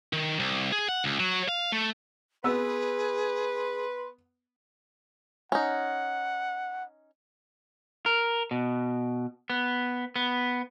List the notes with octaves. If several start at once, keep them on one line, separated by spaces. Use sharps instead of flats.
D#3
C2
G#4
F#5
C#2
F#3
F5
A3
B3 G#4 B4 C6 E6
C#4 D#4 F#5
A#4
B2
B3
B3